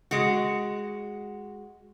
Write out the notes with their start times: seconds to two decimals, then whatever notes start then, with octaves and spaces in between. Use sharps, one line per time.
0.11 G#3 F#4